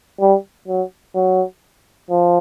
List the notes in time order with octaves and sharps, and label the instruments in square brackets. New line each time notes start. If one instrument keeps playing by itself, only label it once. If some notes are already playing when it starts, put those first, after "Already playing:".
[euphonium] G3
F#3
F#3
F3